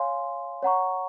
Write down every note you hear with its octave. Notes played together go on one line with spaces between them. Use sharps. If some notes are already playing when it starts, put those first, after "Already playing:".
Already playing: C#5 F5 G#5 C6
C#5 F#5 A#5 C#6